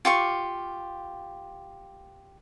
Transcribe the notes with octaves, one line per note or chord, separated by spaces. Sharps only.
F4 G4 C#6